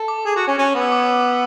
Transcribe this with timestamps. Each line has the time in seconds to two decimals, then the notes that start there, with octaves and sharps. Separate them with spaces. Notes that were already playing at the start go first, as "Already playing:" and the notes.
Already playing: A4
0.08 D6
0.25 G#4
0.36 F#4
0.47 C#4
0.58 C#4
0.75 B3
0.81 E6
0.92 D6